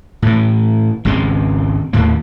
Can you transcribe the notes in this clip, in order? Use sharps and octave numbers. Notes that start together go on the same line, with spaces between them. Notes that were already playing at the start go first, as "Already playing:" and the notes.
A2 E3
G#1 C#2 G#3 C4
D#2 A2 A#3